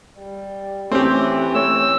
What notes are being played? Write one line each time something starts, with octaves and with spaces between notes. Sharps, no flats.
G3
E3 A3 C4 C#4 G4
A3 C#5 E6